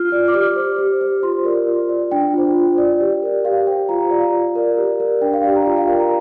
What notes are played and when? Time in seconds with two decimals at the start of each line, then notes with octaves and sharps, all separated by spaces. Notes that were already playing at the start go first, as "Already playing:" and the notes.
Already playing: F4 F6
0.12 D5
0.28 D6
0.34 G4 F6
0.56 C5
0.78 G4
1.01 C5
1.23 F4 C6
1.45 A#4 D5
1.68 F4
1.89 D5
2.11 D4 G5
2.34 F4 C5
2.55 F4
2.78 D5
3.00 G4
3.23 A#4 D5
3.45 G4 F5
3.67 C5 G5
3.89 F4 A#5
4.11 D5 F5
4.33 F4
4.55 A#4 D5
4.77 G4
5.00 A#4 D5
5.21 D4 G5
5.34 F5
5.44 G4 D5 G5
5.56 A#5
5.66 F4 G5
5.77 F5
5.88 A#4 D5 G5
6.00 A#5